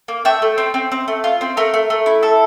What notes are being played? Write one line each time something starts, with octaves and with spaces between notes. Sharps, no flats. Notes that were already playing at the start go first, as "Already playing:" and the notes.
A#3
A3 E5 G5
A3
C4
C4
C4
A3
F4
C4
A3 A#4
A3
A3
E4
A4